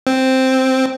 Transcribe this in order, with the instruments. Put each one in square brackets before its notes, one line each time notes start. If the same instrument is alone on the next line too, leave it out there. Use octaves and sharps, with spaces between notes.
[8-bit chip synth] C4